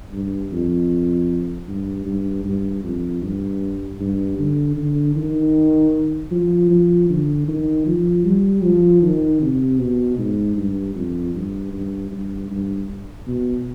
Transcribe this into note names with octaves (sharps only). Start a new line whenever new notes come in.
G2
F2
G2
G2
G2
F2
G2
G2
D3
D3
D#3
F3
F3
D3
D#3
F3
G3
F3
D#3
C3
B2
G#2
G2
F2
G2
G2
G2
G2
B2